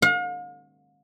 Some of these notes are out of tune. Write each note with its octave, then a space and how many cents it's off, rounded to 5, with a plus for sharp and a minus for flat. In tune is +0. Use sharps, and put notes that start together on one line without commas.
F5 +45